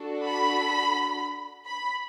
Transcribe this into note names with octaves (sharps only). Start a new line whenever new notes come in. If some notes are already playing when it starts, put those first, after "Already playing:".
Already playing: D4 F#4 A4
B5
B5